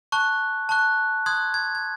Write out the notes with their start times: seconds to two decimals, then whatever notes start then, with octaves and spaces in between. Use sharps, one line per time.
0.12 A5 C#6 F#6
0.69 A5 C#6 F#6
1.26 C6 D#6 F#6 G#6
1.54 G#6
1.75 G#6